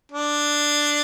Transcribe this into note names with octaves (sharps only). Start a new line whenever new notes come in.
D4